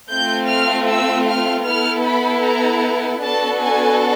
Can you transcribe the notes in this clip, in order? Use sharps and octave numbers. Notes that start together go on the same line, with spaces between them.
A3 C4 F4 G6
F6
E6
F6
B3 E4 A4 F6
B5
A#5
B3 D4 F#4 A4 A5
G#5